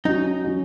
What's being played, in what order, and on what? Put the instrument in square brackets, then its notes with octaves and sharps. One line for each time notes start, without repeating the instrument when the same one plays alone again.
[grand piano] F#3 C#4 F#4 [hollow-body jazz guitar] D#4
[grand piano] F#3 C#4 F#4